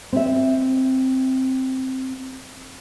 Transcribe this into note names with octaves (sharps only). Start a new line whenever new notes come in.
C4 E5